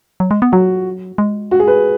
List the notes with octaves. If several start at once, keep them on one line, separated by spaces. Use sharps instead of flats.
F#3
G#3
B3
F#3 F#4
G#3
F#4
G#4
B4